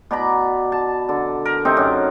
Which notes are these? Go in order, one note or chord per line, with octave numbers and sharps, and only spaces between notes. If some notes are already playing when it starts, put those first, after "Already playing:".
B2 D5 A#5 B5
A5
D3
A#4
C3 C4 D#4
F#2